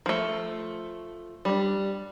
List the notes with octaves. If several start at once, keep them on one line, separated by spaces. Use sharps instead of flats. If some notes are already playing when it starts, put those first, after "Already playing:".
F3 A3
G3 D4